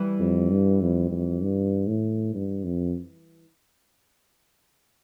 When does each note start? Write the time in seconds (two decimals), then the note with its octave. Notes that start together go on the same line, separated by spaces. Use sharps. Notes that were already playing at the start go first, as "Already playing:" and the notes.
Already playing: E3 G3
0.19 F2
0.51 G2
0.81 F2
1.11 F2
1.42 G2
1.88 A2
2.34 G2
2.64 F2